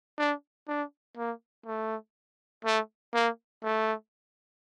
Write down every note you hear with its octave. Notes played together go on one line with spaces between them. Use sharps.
D4
D4
A#3
A3
A3
A#3
A3